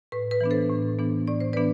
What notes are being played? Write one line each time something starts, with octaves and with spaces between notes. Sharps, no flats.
A2 B4
B4
E3 B3 D4
A4 C5
A2
E3 B3 D4
A2 D5
C5
E3 B3 D4 B4 D5